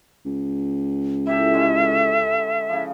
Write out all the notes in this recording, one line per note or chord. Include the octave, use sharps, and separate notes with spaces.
C#2
E4 G4 A4 E5
D3 G#3 C#4
C#3 F3